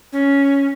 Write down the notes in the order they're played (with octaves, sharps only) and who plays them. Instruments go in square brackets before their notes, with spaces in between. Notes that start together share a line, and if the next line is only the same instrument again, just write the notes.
[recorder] C#4